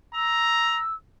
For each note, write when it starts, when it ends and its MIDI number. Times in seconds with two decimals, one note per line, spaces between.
0.14 0.79 82
0.14 0.94 88